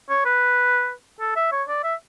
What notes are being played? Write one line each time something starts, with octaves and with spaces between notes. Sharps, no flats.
C#5
B4
A4
E5
C#5
D5
E5